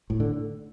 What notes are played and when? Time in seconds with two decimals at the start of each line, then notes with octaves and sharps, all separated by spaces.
0.10 A2
0.20 D3